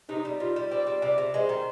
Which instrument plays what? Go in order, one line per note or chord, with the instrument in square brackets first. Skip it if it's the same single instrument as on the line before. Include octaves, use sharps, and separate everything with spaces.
[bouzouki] C3 [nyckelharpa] D#4
[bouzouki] G3
[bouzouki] C3 [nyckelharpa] F4
[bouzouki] G3
[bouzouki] C4 [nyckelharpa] D5
[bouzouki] G3
[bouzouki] C3 [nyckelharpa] D5
[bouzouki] C3
[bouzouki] G#3 [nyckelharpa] C5
[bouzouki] D#3